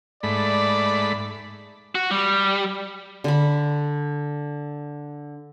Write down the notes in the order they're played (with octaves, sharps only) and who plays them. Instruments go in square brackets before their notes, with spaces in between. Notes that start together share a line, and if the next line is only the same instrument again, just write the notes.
[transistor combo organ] G#2 A3 B5 [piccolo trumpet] D5
[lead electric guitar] F#4
G3
[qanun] D3 B5